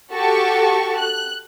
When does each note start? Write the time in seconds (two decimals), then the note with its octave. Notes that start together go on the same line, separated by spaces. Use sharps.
0.11 F#4 G4 A4 A5 C#6
0.97 F#6